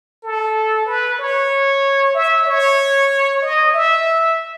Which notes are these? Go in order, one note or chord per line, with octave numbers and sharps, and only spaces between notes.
A4
B4
C#5
E5
C#5
D#5
E5